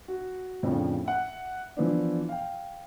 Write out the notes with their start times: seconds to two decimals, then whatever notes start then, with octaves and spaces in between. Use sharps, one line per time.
0.08 F#4
0.63 F2 A2 C#3 F3 D4
1.05 E5 F#5
1.77 E3 F3 B3 D4
2.29 F5 G5